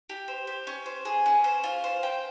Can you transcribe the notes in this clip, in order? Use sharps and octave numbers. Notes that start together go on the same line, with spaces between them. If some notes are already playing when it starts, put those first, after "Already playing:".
G4
C5
G4
C#4
C5
G#4
C#4
C5
F4
C5
G5